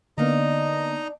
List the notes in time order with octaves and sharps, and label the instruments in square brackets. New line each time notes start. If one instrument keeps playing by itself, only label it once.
[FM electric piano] D3 A#3 B3 [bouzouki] D4 F5 [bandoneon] D#4 D#5 A#5